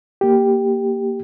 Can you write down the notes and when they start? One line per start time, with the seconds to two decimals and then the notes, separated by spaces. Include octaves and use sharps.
0.21 A#3 G4